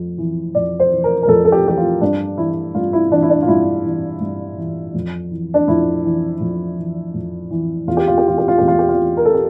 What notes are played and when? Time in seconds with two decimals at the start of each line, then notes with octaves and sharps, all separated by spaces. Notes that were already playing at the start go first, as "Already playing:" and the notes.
Already playing: F2
0.18 E3
0.55 F2 D5
0.80 C5
0.92 E3
1.04 A#4
1.23 A#4
1.28 F2 A4
1.45 A4
1.52 G4
1.65 E3 G4
1.77 F4
2.01 G2 D4
2.38 E3 E4
2.75 G2 F4
2.93 E4
3.11 E3 D4
3.23 E4
3.30 D4
3.42 F4
3.48 G2 E4
3.84 E3
4.21 G2
4.58 E3
4.94 F2
5.31 E3
5.54 D4
5.68 F2 E4
6.04 E3
6.41 F2
6.78 E3
7.14 F2
7.51 E3
7.87 E2 F4
7.97 G4
8.08 F4
8.18 G4
8.24 E3 F4
8.38 G4
8.48 F4
8.58 E2 G4
8.68 F4
8.79 G4
8.89 F4
8.97 E3
9.17 A#4
9.25 A4
9.34 G4